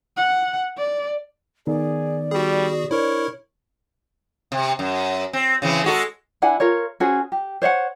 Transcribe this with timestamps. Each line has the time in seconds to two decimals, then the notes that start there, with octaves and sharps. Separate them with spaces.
0.17 F#5
0.77 D5
1.67 D#3 B3 D#4 G#4 D5
2.31 G3 F#4 G#4
2.91 D4 E4 A#4 C5 C#5
4.52 C3
4.79 F#2
5.33 C4
5.62 C#3 E3 C4
5.84 G#3 F#4 A4
6.42 D4 E4 F#5 G#5
6.60 F4 A#4 C#5
7.00 C#4 F#4 G#4 C5
7.32 G4
7.62 C5 C#5 F5 F#5